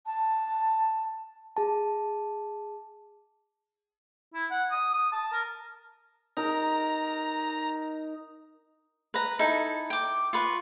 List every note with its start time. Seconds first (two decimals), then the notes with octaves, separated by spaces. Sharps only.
0.06 A5
1.57 G#4 A5
4.34 E4
4.51 F#5
4.71 D#6
4.94 D#6
5.12 A5
5.32 A#4
6.37 D#4 A#4 A#5
9.14 B4 A#5
9.39 D#4 E4 A4
9.90 G5 D6
10.33 F4 B4 C#6